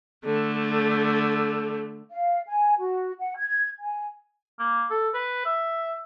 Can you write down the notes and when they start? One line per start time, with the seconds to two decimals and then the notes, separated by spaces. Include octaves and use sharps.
0.24 D3 A3
2.11 F5
2.48 G#5
2.80 F#4
3.20 F#5
3.37 G#6
3.81 G#5
4.59 A#3
4.90 A4
5.14 B4
5.46 E5